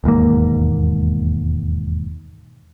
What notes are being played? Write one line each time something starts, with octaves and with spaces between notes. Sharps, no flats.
E1 D#2 G#2 A#3